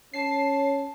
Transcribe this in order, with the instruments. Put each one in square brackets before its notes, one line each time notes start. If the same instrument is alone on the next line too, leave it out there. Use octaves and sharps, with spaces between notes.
[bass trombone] C#4 [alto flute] C#5 [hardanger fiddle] A5 [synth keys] C7